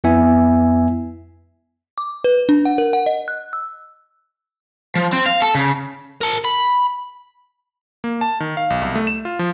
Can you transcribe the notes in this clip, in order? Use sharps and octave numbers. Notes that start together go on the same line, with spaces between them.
F2 B3 E4 E5 G#5
D6
B4
D4
F#5
A#4
F#5
D#5
F#6
E6
F3
C4
F5
A4
C#3
A#4 A5
B5
A#3
A5
D#3
F5
B1
C2
A3
E7
F4
F3